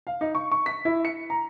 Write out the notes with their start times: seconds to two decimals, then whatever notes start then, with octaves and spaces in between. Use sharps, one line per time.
0.07 F5
0.21 D#4
0.35 C#6
0.52 C#6
0.66 B6
0.85 E4
1.05 C#7
1.30 A#5